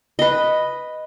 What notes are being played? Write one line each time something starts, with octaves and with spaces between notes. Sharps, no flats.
B4 D#5